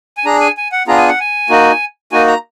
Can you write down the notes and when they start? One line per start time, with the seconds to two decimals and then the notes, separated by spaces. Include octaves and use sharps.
0.17 G#5
0.25 D4 G#4 A#5
0.41 G#5
0.57 G#5
0.72 F#5
0.88 B3 D4 F4 G#4 A#5
0.98 G#5
1.09 F#5
1.20 G#5
1.50 A#3 D#4 F#4
2.12 A#3 D#4 F#4 G#5
2.27 A#5